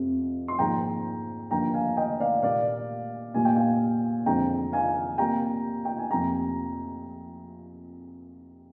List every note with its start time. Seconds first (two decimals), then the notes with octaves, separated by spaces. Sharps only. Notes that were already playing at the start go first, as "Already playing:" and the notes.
Already playing: F2 C3 F3 C4
0.48 C6
0.59 G#2 F3 A#3 G5 A#5
1.51 G2 D3 F3 A#3 G5 A#5
1.74 F5 G#5
1.97 D#5 G5
2.20 D5 F5
2.42 A#2 G3 A#3 D5 F5
3.34 A#2 G3 A#3 G#5
3.45 G5
3.55 F5 G#5
4.26 F2 D3 F3 G#3 C4 G5 A#5
4.73 F5 G#5
5.18 C3 G3 A#3 G5 A#5
5.85 G5
5.98 G#5
6.10 F2 C3 G3 A#3 G5 A#5